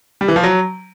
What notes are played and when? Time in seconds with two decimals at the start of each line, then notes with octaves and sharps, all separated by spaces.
0.21 G3
0.28 E3
0.36 F3
0.43 F#3